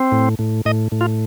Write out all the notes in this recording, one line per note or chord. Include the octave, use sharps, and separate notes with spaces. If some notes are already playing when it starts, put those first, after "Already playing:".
Already playing: C4
A2
A2
A2 D#5
A2
F4